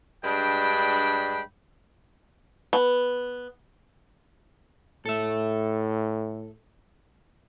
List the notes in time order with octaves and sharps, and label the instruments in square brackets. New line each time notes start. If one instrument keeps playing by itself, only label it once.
[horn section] G2 G#3 D4 G5 B5
[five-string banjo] B3
[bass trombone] A2 [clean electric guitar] A4 E5